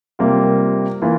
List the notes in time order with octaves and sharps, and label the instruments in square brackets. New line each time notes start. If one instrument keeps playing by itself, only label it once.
[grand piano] C3 G3 A#3 F4
E3 A#3 F4